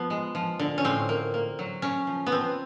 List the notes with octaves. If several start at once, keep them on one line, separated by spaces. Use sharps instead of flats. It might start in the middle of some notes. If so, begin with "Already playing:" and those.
Already playing: F3 B3
G#3
F3
D3
C#4
A2 C4
A#3
A#3
F#3
C#3 C#4
F3
B3
F3 C4